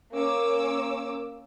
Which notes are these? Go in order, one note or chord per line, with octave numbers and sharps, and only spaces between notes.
A#3 C#4 D6 E6